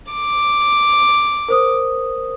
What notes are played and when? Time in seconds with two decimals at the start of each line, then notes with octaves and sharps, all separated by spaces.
0.13 D6
1.48 A#4 C5 D#6